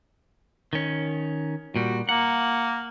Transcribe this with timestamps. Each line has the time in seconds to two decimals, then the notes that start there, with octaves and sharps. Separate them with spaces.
0.73 D#3 C#4
1.76 A#2 G3 F#4
2.09 A#3 F#5